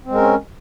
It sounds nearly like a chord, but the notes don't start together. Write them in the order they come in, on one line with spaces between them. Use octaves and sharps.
C4 G#3 A#4 C#4